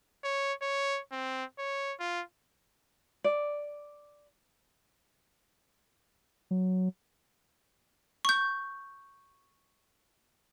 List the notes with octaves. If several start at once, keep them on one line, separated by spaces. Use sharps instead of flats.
C#5
C#5
C4
C#5
F4
D5
F#3
C#6 G6